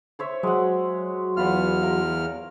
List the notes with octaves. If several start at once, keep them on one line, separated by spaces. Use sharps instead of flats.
C5 C#5 E5
F#3 G#3 F#5
E2 F4 B4 F#5 F6
A#4 F5